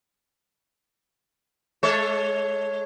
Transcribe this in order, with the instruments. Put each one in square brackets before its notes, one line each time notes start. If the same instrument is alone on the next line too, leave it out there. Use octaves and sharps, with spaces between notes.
[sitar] G#3 A4 C#5